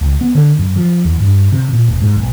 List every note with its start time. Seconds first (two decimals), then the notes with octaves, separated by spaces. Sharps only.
0.01 C#2
0.21 B3
0.35 D3
0.59 F#2
0.76 F3
1.05 E2
1.20 G2
1.52 C3
1.73 A#2
1.88 E1
2.02 G#2
2.17 B1